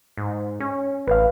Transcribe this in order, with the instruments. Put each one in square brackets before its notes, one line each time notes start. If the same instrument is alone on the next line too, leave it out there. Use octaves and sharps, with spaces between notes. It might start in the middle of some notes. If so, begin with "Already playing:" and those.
[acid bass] G#2
C#4
[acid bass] A1 [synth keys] B4 F5